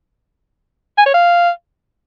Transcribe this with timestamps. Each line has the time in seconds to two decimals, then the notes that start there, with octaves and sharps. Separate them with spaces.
0.98 G#5
1.06 C#5
1.14 F5